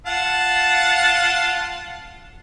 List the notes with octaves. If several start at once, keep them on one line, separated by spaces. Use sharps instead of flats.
F4 F#5 A5